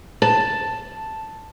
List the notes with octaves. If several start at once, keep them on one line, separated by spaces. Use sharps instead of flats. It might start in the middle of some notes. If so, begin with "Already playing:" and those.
A5